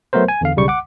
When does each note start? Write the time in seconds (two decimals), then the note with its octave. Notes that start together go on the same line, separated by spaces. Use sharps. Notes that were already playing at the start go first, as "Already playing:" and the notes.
0.13 F#3 A3 B3 A#4 C5
0.28 G#5
0.41 E2 D3 F5
0.56 B1 C#3 G3 C#6
0.68 F#5 D6